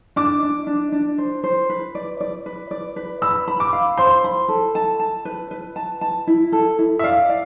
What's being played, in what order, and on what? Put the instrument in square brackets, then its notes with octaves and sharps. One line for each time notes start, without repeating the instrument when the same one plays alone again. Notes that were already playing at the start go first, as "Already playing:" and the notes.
[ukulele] D4 [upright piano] D6
[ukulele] D4
D4
D4
C5
C5
B4
D5
D5
B4
D5
B4
[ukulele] B5 [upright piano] E6
[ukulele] B5
[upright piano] D6
[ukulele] F5
[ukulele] C5 [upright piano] C6
[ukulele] B5
A4
A5
A5
B4
B4
A5
A5
E4
A4
E4
[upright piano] E5
[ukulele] D5 [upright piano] F5
[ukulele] D5